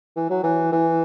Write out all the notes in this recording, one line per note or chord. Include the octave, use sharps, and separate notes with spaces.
E3
F#3
E3
E3